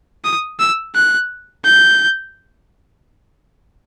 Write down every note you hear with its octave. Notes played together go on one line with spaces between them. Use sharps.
D#6
E6
F#6
G6